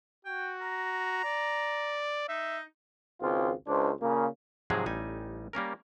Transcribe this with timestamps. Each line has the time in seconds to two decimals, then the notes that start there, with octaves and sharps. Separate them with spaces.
0.25 F#4 G5
0.61 A#5
1.25 D5
2.29 D#4 E5
3.21 G#1 C#2 C4 F4
3.67 C#2 D4 C5
4.00 A#2 C#3
4.70 G#2 C3 F3 F#3 G#3 G#4
4.86 A1 G3 D#4 G#5
5.53 G3 A#3 C#4 A#4